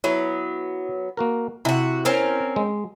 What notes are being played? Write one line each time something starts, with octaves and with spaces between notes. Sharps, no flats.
F#3 B3 E4
A#3 F#4 A#4
C3 E4 F#4
C4 C#4 A#4
G#3